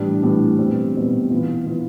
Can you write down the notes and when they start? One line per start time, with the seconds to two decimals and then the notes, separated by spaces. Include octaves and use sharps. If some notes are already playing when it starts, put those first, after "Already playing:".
Already playing: A2 E3 G3 D4
0.23 A2 E3 G3 D4
0.58 E2 B2 G3 C4
0.95 E2 B2 G3 C4
1.30 E3 B3 F4
1.66 E3 B3 F4